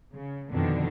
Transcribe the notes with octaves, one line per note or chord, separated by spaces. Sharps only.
C#3
F2 B2 D3 D#3 D4